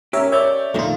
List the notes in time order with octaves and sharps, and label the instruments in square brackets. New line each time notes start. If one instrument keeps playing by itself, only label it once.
[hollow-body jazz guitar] C#4 G4 [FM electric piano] A#4 C#5 E5
[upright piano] C#5 D5 [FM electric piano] E5 G6
[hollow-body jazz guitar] F2 A#2 D#3 [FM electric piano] A3 F4